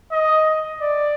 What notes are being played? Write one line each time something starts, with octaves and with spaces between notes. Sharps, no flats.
D#5
D5